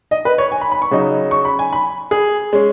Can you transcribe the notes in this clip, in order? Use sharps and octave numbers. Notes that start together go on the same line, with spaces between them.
D#5
B4
C#5
G#5
B5
B5
C#6
C#3 F#3 D#4
C#6
B5
G#5
B5
G#4
G#3 C#4